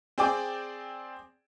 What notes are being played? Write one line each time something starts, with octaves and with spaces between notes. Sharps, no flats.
C4 G#4 D5 G5 D6